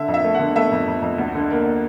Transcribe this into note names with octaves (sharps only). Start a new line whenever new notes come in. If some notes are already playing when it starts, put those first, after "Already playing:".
Already playing: D3 E5
F2
E5
A3
D3 F#5
A3 E5
F2
F2
F2
D2
D3
A#3